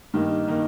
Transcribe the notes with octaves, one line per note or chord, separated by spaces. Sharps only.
G2 D#3 A#3 D#4
D#3 A#3 D#4